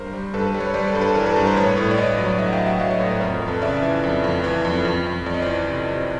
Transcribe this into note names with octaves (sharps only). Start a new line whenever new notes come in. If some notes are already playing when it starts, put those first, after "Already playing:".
Already playing: G2 A#4 C5
G3
G2 A4 B4
A4 B4
G3
B4 C#5
G3 C5 D5
A4 B4
G2
A4 B4
E3 A#4
A4 B4
G2 A#4
A#4 C5
A2 B4 C#5
A2
D5
A2 C#5 D#5
F#3
A2 D5 E5
F#5
F5 G5
F#3
E5 F#5
F#3 D#5 F5
C#5 D#5
A2 C5 D5
B4 C#5
F2 A#4 C5
A#4
F2
A4 B4
C#3 D5 E5
E3
F2
F2
E3
F2
F2
F2
F2 D5
D#5
E3 C5 D5
C3
C3